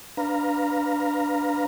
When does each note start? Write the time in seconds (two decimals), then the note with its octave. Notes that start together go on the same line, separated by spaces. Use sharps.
0.17 D4 B4 F5 A#5